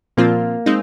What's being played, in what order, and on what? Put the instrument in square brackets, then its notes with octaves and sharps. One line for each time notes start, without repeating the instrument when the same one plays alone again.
[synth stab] A#2 F3 C4 F4 [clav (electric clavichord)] A#3
[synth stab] G#3 C4 D#4